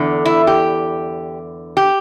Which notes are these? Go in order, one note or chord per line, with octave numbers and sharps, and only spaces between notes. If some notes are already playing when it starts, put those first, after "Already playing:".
Already playing: E2 D3
E4
G4
G4